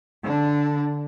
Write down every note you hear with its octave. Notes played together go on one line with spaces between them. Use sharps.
D3 D4